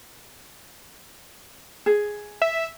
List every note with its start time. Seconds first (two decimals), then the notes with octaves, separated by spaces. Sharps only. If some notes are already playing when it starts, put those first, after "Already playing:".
1.86 G#4
2.42 E5